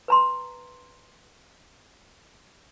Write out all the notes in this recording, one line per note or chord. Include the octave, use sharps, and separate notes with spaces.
B4 A#5 C6